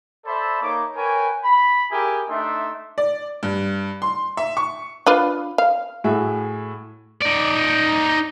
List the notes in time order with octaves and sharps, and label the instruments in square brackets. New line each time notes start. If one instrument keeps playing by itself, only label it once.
[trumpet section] A4 C5 D5 E5 A5 B5
A#3 D#4 C#5 D6
A#4 B4 C#5 G5 G#5
B5
E4 G4 G#4 A#4 G#5
A3 D4 D#4 E5 C6
[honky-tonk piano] D5
G2
C6
E5
C#6
[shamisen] D4 F4 B4
F5
[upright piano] A2 F#4 G#4 E5
[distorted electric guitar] D#4 D5